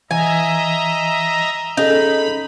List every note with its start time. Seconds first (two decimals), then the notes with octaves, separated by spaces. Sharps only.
0.11 E3 D#5 E5 G#5 A#5
1.77 C#4 D#4 G#4 A4 B5